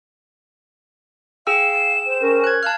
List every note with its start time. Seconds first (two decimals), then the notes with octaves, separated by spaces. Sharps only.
1.47 G#4 F5 G5 E6 E7
2.06 C5
2.22 C#4 A#4
2.44 F#6 G#6
2.63 F5 A5 F6 F#6